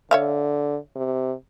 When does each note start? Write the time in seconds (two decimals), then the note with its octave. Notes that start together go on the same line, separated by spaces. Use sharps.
0.11 D3 C#5 E5 F5
0.96 C3